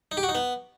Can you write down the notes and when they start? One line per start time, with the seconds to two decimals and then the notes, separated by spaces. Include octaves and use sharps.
0.12 D#4
0.17 G4
0.23 F#4
0.29 D#4
0.35 B3